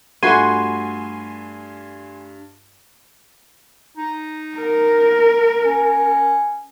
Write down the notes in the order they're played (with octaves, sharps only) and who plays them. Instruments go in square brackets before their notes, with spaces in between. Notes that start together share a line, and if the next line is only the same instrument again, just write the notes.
[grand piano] G2 [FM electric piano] A3 [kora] F4 F#4 B4 [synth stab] G#5 C6
[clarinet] D#4
[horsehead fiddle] A#4
[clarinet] C#4